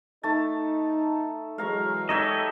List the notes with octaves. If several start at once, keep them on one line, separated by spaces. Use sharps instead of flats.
A3 D#4 A5
E3 F#3 G#3 F5 A#5 C#6
D#4 G4 A4 C#5 D#5 E5